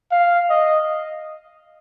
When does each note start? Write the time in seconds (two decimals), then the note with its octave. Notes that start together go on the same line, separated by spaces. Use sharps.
0.11 F5
0.50 D#5